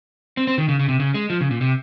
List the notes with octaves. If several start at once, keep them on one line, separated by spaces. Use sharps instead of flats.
C4
C4
D#3
C#3
C#3
C3
C#3
G#3
F3
C#3
A#2
C3